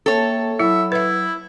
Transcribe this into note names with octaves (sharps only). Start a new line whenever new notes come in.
A#3 A4 C#5 E5 G5
F#3 E4 E5 B5
E4 B4 E5